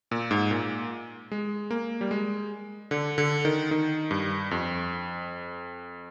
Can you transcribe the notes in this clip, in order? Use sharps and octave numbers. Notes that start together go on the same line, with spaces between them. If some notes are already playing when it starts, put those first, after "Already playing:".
A#2
G#2
A#2
G#3
A#3
G3
G#3
D3
D3
D#3
D#3
G2
F2